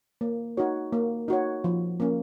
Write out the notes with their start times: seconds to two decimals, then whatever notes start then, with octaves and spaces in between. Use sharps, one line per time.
0.21 A#3
0.57 D#4 F#4 C#5
0.93 A#3
1.28 D#4 F#4 C#5
1.64 F3
2.00 A#3 C#4